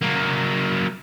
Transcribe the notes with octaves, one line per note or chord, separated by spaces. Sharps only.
F#3 A#3